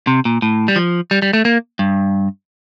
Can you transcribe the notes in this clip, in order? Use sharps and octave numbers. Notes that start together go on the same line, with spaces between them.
C3
A#2
A2
G3
F3
G3
G3
A3
A#3
G2